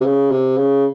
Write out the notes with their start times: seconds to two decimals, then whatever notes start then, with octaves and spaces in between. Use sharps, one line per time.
0.01 C3
0.06 C#3
0.31 C3
0.58 C#3